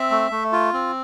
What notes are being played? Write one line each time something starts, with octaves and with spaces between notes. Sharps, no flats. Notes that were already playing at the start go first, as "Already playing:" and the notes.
Already playing: C4 E5
A3
A3
F4
C4